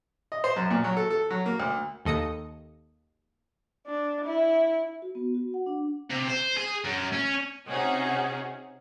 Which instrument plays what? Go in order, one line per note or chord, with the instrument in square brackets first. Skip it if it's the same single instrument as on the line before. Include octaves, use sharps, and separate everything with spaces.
[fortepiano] D#5
C5
F#2
A#2
F#3
A4
A4
F#3
A#3
D2
[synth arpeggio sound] D#2 A4 D#5 D#6 C#7
[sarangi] D4
E4
[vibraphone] F#4
B3
F#4
F#5
D4
[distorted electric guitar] C3
C5
G#4
F#2
C#4
[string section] C3 C#4 D#4 F#4 G#4